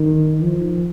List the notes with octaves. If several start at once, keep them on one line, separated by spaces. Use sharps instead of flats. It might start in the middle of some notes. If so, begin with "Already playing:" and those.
Already playing: D#3
F3